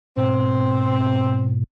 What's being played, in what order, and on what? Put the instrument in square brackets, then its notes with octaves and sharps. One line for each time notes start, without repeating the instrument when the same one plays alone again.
[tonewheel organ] G#2 B2 [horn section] C4